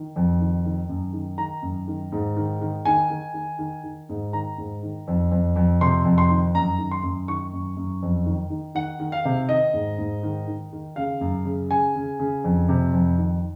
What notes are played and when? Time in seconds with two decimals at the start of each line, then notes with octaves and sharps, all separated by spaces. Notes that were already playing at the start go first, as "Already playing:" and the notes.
Already playing: D#3
0.16 F2
0.40 D#3
0.65 D#3
0.89 F#2
1.13 D#3
1.38 D#3 A#5
1.62 F#2
1.88 D#3
2.12 G#2
2.37 D#3
2.61 D#3
2.85 D#3 G#5
3.10 D#3
3.34 D#3
3.59 D#3
3.84 D#3
4.09 G#2
4.33 D#3 A#5
4.58 G#2
4.83 D#3
5.08 F2
5.31 F2
5.56 F2
5.81 C3 C6
6.05 F2
6.18 C6
6.30 D#3
6.55 F#2 A#5
6.78 D#3
6.91 C6
7.03 F#2
7.28 D#3 C#6
7.53 F#2
7.77 F#2
8.02 F2
8.26 D#3
8.50 D#3
8.75 D#3 F#5
9.00 D#3
9.12 F5
9.25 C3
9.49 D#3 D#5
9.73 G#2
9.98 G#2
10.23 D#3
10.48 D#3
10.73 D#3
10.96 C#3 F5
11.21 F#2
11.45 C#3
11.71 C#3 G#5
11.96 C#3
12.20 C#3
12.44 F2
12.69 C3
12.93 F2
13.18 D#3